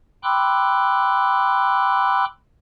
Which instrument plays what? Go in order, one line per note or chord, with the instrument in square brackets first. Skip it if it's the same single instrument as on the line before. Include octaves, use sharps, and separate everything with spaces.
[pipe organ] G5 B5 C6 D6 E6 F#6